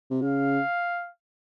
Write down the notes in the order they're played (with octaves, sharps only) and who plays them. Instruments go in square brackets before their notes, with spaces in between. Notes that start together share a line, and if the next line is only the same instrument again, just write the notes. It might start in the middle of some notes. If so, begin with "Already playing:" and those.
[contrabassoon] C3
[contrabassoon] C#3 [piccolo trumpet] F5